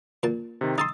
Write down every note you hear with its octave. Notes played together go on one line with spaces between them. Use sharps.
A#2 A5
C3 D#3
D#4 A5 C6 D#6 E6 A6